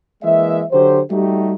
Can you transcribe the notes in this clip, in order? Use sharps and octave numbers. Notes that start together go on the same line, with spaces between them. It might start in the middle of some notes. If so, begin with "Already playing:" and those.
E3 G#3 A#3 E5
D3 F#3 G4 C5
G3 A3 D#4 F#4 G4